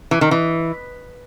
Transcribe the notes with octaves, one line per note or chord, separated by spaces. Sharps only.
E3
D#3
E3